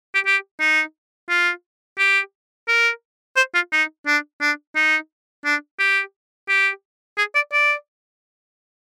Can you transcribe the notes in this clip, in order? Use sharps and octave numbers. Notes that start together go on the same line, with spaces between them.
G4
G4
D#4
F4
G4
A#4
C5
F4
D#4
D4
D4
D#4
D4
G4
G4
G#4
D5
D5